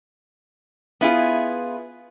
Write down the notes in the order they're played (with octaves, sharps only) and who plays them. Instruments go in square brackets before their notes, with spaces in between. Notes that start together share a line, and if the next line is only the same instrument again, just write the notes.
[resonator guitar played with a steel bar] B3 E4 F4 G#4